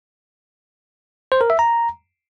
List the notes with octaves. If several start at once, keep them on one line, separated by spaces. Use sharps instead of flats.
C5
A#4
E5
A#5